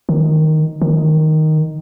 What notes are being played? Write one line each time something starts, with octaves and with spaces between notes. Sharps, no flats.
D#3
D#3